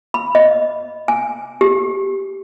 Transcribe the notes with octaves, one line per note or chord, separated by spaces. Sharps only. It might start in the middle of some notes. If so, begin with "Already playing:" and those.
B5
D#5
G#5
G4